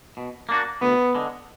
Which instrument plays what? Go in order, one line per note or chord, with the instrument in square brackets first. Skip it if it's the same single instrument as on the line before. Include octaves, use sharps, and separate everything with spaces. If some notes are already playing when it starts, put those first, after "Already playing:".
[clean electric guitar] B2
A#3 D4 F#4
[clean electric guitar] D2 [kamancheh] B3
[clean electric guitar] D3 G#3